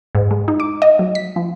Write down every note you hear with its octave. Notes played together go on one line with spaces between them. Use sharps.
G#2
G#3
D#4
D6
D#5
F#3
B6
F3